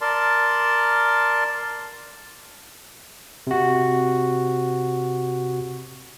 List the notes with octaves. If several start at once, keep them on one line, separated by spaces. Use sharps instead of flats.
A#4 D5 A5 C6
C3 F#4